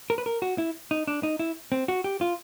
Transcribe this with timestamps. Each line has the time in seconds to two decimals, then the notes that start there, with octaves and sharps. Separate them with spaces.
0.10 A#4
0.18 B4
0.26 A#4
0.42 F#4
0.58 E4
0.91 D#4
1.07 D4
1.23 D#4
1.39 E4
1.72 C4
1.88 F#4
2.04 G4
2.21 F4